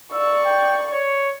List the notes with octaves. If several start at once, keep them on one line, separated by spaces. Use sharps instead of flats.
D5 C#6 E6
G5
C#5